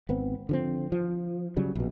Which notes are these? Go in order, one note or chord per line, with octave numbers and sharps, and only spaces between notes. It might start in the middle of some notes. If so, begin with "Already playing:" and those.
G#1 B3 C4
D3 F3 C4
F3
C#3 F#3 G3
A#1 B2